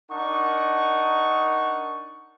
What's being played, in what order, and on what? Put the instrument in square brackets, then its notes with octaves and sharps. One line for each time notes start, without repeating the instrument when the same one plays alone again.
[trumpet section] D4 D#4 A#4 F#5 C#6